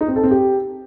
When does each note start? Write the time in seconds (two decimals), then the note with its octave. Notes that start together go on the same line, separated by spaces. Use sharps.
0.01 D#4
0.08 C4
0.16 A4
0.23 C4
0.31 G4